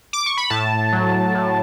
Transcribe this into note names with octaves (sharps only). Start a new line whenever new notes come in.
D6
C#6
B5
A2 A5
F#3
A2